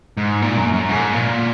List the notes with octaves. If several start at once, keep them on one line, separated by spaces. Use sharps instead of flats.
G#2
A#2
F#2
F#2
G#2
A#2